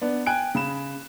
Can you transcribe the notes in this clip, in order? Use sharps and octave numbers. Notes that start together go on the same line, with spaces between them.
B3 D4
G5 G#5 F#6 D7
C#3 B5 E7